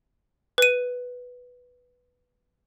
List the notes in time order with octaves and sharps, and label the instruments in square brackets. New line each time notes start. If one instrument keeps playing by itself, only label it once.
[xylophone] B4 D#7